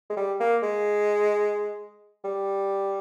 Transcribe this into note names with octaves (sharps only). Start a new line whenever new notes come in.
G#3
G3
A#3
G#3
G3